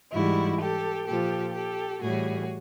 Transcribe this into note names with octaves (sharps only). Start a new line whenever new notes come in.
G#2 E3 G3 E4 F#4
G4 A4
A#2 F3 G4 A4
G4 A4
A2 E3 G3 F#4 G#4